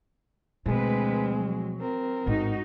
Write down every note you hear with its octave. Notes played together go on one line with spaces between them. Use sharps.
D2 B2 F3 G#3 C4 B4
F#3
C4 A#4
A1 G#2 D#4 F#4